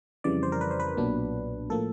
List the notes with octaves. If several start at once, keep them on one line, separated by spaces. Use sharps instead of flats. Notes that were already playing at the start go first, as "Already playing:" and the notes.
F2 C#3 E3 G3 D5
C5
A#4
B4
C5
B4
B1 A#2 F#3 B3 D4
A2 F3 A#3 A4